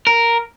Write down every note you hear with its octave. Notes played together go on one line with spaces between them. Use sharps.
A#4